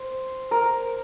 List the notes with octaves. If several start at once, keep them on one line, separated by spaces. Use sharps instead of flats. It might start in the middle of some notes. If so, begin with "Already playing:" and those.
Already playing: C5
A#4